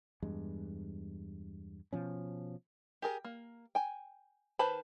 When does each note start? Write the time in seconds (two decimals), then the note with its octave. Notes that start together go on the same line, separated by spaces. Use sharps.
0.22 E2 G2 G#3
1.93 B2 F3 C#4
3.02 G4 G#4 A#4
3.25 A#3
3.75 G5 G#5
4.59 D#3 B4 C5 A5 B5